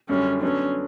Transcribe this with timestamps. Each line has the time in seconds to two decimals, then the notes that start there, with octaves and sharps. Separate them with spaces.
0.09 F#2 D3 G3 C#4
0.42 D3 F#3 B3 C#4 D4